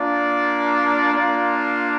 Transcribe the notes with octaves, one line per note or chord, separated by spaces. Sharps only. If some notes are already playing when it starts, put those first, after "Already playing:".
Already playing: A#3 D4 F4 D5
A#3 D4 F4